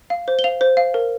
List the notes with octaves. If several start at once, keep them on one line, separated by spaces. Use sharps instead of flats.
F5
C5
G7
F5 F7
C5
F5
A#4